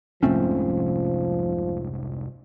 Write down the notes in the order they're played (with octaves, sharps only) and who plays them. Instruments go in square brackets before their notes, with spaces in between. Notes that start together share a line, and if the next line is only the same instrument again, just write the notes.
[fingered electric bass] F1 C2 G#2 [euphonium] F3 [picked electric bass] A3 C4 C#4